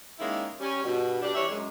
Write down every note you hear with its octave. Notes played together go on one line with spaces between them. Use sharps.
D#3 G#3 A#3 C#4 E4
G3 C#4
G2 B2
G3 D4
E3 G3 D4 C#5 E5
F#2 G#3